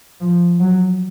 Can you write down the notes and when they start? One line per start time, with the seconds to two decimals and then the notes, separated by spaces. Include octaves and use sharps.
0.21 F3
0.60 F#3